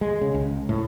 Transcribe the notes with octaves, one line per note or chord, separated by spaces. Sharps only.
G#3
C#3
C#2
A2